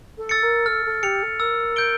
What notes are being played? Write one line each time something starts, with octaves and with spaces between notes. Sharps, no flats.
A4
E6 A6 C#7
A#4
A4 F6
A4
G4 C#7 F7
A4
A#4 E6
G6 D7 G7